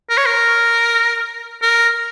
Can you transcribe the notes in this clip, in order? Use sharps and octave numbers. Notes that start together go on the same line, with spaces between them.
A#4
C#5
A#4
A#4